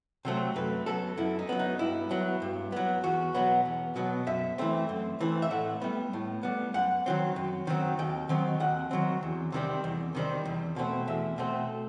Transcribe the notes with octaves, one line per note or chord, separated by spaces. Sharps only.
C3 F#3 A3 C4
F#2 B4
F#3 B3 A4
F#2 E4
D#4
F#3 B3
D#4
G2 E4
F#3 B3
G2
F#3 B3
E2 F#4
B2 F#3 B3
E2
B2 F#3 B3
F#2 E5
E3 A3 C4
F#2
E3 A3 C4
E5
A2 F#5
G3 B3
A2
G3 B3
F#2 F#5
D#3 F#3 C4
F#2
D#3 F#3 C4
D#2 G5
D#3 F#3 C4
D#2 F#5
D#3 F#3 C4
E2
C3 D#3 G3 C4
E2
C3 D#3 G3 C4
E2
B2 A3 C4
E2 E5
B2 A3 C4